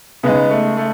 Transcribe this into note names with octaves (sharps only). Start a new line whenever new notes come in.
C#3 G#3 B3 D#4
A3
A3